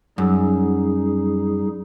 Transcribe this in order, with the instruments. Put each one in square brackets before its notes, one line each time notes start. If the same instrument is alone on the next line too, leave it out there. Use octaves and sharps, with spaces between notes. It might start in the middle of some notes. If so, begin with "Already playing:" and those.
[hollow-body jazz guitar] F#2 [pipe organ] G3 D#4 G#4